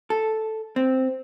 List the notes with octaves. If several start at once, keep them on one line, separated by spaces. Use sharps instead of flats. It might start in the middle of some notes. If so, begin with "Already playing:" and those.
A4
C4